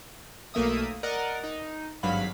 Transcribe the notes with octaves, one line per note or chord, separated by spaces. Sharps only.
B1 A3 A#3 E5 D#6
A#4 D5 D#5 F#5
D#4
G#1 G2 F#3 F5 B5